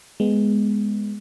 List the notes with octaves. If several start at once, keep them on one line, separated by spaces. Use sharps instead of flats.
G#3 B3